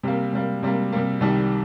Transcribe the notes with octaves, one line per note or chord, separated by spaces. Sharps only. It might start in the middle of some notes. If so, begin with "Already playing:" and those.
C3 G3 A#3
C3 G3 A#3
C3 G3 A#3
C3 G3 A#3
C2 C3 D#3 G3